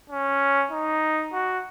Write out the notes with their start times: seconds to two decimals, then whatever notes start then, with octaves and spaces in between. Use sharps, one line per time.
0.10 C#4
0.72 D#4
1.33 F#4